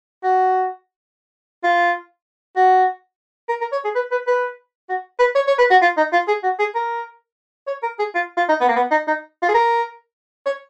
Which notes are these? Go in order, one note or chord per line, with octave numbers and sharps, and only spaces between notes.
F#4
F4
F#4
A#4
A#4
C#5
G#4
B4
B4
B4
F#4
B4
C#5
C#5
B4
F#4
F4
D#4
F4
G#4
F#4
G#4
A#4
C#5
A#4
G#4
F4
F4
D#4
B3
A#3
B3
D#4
D#4
F4
G#4
A#4
C#5